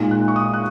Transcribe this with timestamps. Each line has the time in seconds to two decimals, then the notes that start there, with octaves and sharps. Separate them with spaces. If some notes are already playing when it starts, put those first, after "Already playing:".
Already playing: A#2 G#3 D#4
0.11 F#6
0.28 C#6
0.36 D#6
0.53 F#6